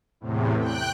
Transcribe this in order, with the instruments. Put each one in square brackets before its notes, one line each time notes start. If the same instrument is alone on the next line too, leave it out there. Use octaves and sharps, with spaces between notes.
[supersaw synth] E2 A2 C3
G5 F#6